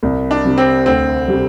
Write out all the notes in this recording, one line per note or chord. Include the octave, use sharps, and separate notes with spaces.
C2
D4
C3 G3
C4
D2 C4
C3 G3